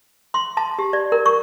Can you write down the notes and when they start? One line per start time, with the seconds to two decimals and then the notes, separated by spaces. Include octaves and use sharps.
0.34 C6
0.57 A5
0.79 G4
0.93 D5
1.12 A#4
1.26 C#6